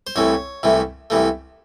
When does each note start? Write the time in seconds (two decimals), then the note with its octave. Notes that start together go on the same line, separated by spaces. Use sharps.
0.07 C5
0.16 C2 C3 E3 A3 C#5
0.63 C2 C3 E3 A3
1.10 C2 C3 E3 A3